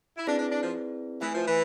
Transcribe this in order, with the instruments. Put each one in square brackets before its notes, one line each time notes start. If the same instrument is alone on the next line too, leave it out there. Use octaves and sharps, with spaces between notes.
[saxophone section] E4
[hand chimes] C4 E4 G#4 B4 D5 [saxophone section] D4
[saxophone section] D4
D4
F3
[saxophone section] E3 [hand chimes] A3 E4 B4 E5 G#5
[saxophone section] F3
E3